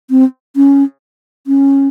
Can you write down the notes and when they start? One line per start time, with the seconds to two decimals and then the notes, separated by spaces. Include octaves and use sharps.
0.10 C4
0.56 C#4
1.47 C#4